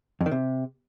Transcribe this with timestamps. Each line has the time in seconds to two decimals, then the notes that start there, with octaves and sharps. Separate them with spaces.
0.21 F2
0.26 D#3
0.31 C3